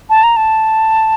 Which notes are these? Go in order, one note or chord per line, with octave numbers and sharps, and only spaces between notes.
A5
A#5
A5